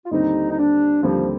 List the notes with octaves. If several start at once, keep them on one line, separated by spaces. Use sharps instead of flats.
F4
D#2 D3 G3 C4 D#4
D#4
D4
D#2 D3 F3 G3 C4